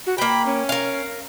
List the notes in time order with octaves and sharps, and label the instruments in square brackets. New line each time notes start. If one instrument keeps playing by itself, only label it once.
[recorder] F#4
[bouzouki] A#3 G5 [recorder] B5
[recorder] C#4
[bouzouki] A#4 F5